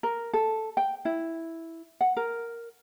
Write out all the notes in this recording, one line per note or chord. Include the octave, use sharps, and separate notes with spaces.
A#4
A4
G5
E4
F#5
A#4